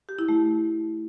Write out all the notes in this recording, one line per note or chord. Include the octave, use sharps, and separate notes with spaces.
G4
E4
A3